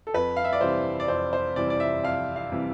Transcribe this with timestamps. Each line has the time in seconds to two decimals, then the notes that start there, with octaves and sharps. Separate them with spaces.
0.07 A4
0.14 F2 B4
0.37 F5
0.44 E5
0.53 D5
0.61 C3 E3 G3 C5
1.00 D5
1.08 F2 C5
1.33 C5
1.56 C3 E3 G3 D5
1.70 D5
1.80 E5
2.03 F2 F5
2.36 F5
2.52 C3 E3 G3